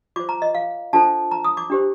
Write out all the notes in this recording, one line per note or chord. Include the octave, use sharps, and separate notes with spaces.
F4 C5 D6
A#5
D#5
F5
D4 F4 A4 C5 A5
A#5
D#6
D6
D4 G4 C5